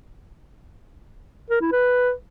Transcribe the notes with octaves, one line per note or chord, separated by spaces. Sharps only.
A#4
E4
B4